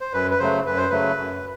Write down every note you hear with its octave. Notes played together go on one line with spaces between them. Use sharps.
C5
F#2 B4
B4
C#3 F#3 A3 C5
F#2 B4
C5
C#3 F#3 A3 B4
F#2